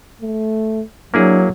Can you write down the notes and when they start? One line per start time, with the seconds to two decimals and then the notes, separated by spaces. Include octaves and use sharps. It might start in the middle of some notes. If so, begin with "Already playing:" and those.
0.22 A3
1.14 F#3 A#3 D4 E4 G#4